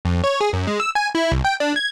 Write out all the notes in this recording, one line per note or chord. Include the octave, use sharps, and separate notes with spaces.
F2
C#5
G#4
F#2
G#3
E6
G#5
E4
C2
G5
D4
G#6